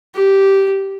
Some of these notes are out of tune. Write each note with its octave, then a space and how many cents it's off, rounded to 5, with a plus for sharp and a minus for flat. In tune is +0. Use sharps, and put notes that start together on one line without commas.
G4 -10